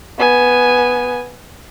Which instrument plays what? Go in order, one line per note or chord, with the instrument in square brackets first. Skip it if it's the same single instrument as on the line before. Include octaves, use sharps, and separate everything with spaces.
[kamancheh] B3 G#5